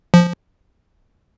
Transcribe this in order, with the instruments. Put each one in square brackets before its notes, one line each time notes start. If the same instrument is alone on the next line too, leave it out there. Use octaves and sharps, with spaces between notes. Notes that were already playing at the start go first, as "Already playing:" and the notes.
[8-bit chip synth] F3